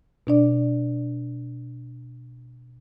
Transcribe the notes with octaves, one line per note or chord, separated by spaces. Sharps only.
B2 D4 D5